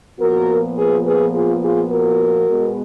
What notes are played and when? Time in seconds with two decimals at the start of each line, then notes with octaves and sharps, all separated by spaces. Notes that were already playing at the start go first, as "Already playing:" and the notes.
0.19 A#2 F3 B3 F#4 A#4
0.77 G#4 B4
1.05 G#4 B4
1.33 F4 G#4
1.61 F4 G#4
1.90 F#4 A#4
2.48 B2 G#3 B3